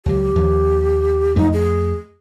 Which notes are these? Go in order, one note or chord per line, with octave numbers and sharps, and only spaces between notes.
C#2 F#3 G4
D#2 F3
F2 A3 D#4
G#4